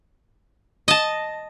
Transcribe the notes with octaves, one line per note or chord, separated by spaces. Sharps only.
D#5 A5